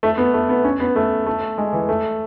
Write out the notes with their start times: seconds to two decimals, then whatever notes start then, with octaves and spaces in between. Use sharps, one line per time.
0.03 A3
0.18 B3
0.34 A3
0.49 B3
0.64 C#4
0.80 B3
0.96 A3
1.26 A3
1.58 G#3
1.73 E3
1.89 A3